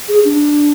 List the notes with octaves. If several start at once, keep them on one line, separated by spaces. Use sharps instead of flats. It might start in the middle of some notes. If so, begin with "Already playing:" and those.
G#4
D4